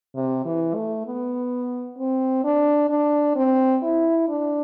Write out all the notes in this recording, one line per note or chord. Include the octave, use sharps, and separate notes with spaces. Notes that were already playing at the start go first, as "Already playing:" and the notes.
C3
E3
A3
B3
C4
D4
D4
C4
E4
D4